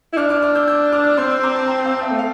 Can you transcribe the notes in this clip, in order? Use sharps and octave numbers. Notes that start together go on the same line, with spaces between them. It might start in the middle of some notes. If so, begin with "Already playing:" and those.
E4
D4 D6 F6
D6 F6
D6 F6
E6 G6
E6 G6
D6 F6
F6
C4 C6 E6
C6 E6
A#5 D6
A5 C6
G5 A#5
F5 A5
E5 G5
A3
F5